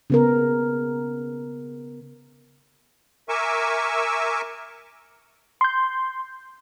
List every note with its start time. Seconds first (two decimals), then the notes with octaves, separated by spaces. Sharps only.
0.10 C#3 B3 A#4
3.29 A#4 E5 G#5 C#6 D6 E6
5.61 C6 G6